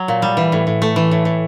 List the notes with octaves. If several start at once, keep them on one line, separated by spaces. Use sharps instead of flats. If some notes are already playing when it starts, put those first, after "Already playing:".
Already playing: F#3
A#2
G3
E3
A2
A2
A3
E3
A2
A2